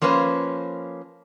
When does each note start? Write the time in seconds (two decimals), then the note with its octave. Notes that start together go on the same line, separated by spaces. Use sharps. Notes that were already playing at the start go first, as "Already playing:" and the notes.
0.02 F3 A#3 C#4 B4 C5